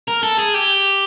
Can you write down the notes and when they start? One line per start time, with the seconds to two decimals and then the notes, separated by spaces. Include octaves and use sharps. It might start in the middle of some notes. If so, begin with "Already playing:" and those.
0.08 A#4
0.23 A4
0.38 G#4
0.54 G4